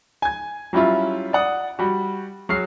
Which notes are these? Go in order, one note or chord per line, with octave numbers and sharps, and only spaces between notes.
G#5 G#6
F#3 G3 C#4 E4 F4
D5 F#5 D#6
G3 F#4
F#3 F#4 G#4 F6 C7